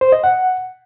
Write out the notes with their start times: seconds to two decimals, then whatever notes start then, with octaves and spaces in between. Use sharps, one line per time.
0.01 C5
0.12 D#5
0.24 F#5